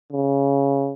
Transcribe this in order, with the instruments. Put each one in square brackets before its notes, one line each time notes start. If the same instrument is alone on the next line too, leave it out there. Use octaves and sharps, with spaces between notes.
[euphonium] C#3